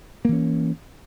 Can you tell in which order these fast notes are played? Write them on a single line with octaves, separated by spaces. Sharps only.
A#3 E3 C#4